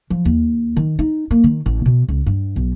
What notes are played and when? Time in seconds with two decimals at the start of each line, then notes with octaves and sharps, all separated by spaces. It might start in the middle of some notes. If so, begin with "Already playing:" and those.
0.10 F3
0.25 D#2
0.77 D#3
0.99 D#4
1.31 A#3
1.44 D#3
1.66 A1
1.85 B2
2.08 C#2
2.26 G2
2.56 B1